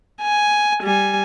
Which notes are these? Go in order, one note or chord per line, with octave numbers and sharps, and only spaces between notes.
G#5
G3 G#5